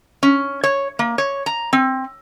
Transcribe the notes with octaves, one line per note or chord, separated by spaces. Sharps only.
C#4
C#5
A#3
C#5
A#5
C4